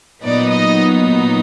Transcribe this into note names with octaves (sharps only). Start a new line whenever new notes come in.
A#2 F#3 B3 D#4 D5
D#5